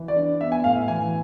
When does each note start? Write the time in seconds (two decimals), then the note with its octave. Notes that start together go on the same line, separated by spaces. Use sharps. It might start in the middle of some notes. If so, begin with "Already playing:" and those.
Already playing: E3
0.08 D5
0.16 D4
0.41 B3 E5
0.52 G#5
0.64 A2 F5
0.76 E5
0.88 E3 G#5